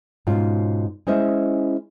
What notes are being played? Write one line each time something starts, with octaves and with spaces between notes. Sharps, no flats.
G#2 B2 C#4 F4
G#3 C#4 E4 C5 D#5 E5